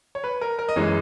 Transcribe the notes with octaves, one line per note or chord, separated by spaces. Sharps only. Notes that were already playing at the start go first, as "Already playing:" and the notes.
C#5
B4
A#4
A#4
D#5
F#2 E3 G#3 C#5